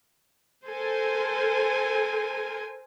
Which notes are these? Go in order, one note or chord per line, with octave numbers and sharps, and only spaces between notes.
A4 A#4 C5 G#5